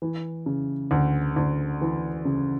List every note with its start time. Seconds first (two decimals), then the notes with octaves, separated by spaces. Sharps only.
0.02 E3
0.46 C#3
0.91 D2
1.36 D2
1.81 E3
2.25 C#3